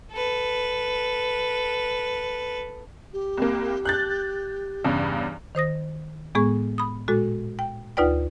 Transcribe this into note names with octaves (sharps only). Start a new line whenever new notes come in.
A4 B4
G4
C2 A#3
F#6 G6 A6
E2 G2 C#3
D#3 C5 D#6 A#6
A2 G#3 B3 G#4 C#6
B5 D#6
A#2 G#3 F#4 A4
G5
D2 D#4 F4 B4 D5 G5